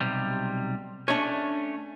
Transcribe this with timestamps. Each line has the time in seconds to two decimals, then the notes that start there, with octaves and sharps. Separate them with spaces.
0.01 B1 C3 G3
1.08 A3 C#4 D4 C#5